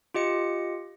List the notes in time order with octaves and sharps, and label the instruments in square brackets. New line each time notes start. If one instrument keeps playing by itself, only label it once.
[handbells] F4 G4 D#5 C#7